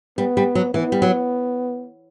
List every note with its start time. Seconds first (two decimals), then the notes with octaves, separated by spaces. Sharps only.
0.18 G3 B3
0.37 G3
0.55 F#3
0.74 E3 B3
0.92 G3
1.02 F#3